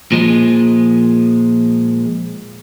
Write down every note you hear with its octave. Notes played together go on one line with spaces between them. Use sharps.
A#2 F3 G#3